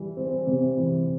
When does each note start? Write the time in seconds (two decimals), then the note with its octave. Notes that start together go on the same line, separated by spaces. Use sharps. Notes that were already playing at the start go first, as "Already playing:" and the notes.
Already playing: E3 G3
0.17 C4
0.47 C3
0.78 E3